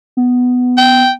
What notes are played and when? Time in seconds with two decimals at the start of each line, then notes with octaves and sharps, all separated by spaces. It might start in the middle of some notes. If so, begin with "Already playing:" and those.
0.17 B3
0.77 G5